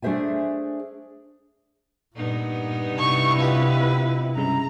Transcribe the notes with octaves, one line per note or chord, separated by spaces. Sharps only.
A3 D4 G#4 C5 E5 G#5
G2 A#2 B3 D#4
C3 E4 C#6
F4 G4 B4 D#5
G2 C#3 G#3 A#5